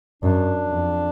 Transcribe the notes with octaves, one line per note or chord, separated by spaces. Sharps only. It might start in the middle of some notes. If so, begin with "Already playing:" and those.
F#2 D4
F2